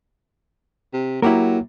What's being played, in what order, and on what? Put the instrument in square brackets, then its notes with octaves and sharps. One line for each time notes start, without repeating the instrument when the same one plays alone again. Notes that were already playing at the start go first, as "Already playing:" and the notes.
[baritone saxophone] C3
[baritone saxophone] F#3 [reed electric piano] A#3 [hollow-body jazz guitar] E4 G4 A#4